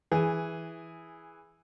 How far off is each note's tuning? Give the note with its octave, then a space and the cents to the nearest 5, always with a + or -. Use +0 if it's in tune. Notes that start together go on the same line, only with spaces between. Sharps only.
E3 +0 G#4 +0